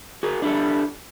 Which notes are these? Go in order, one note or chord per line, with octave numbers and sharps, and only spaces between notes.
F#4 G#4 A#4
D4 E4 G4 A4